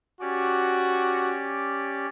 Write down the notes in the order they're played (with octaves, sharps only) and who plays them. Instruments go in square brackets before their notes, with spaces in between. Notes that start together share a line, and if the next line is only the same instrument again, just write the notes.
[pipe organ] C#4 G4 D5 [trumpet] F#4